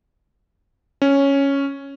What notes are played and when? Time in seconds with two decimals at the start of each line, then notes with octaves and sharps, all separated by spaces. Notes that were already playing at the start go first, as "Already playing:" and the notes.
1.02 C#4